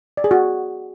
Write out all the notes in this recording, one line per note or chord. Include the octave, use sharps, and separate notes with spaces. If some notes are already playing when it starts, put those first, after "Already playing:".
D5
G#4
F#4